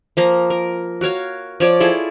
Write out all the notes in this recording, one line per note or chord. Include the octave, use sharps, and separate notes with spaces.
F3 A#3 A#5
A#4
F#4 A#4 C#5 F5
F3 C#5 D5
E4 F4 G#4 A4